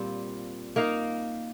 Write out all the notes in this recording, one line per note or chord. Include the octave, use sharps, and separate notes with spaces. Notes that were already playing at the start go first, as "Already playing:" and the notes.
Already playing: A#2 G3 C4 F4
A#3 D#4 A#4 F5